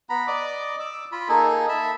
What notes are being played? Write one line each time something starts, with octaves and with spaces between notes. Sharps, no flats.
B3 A#5 B5
D5 D#5 D6
D6 E6
F4 B5
A#3 D#4 G#4 A4
E5 A5 B5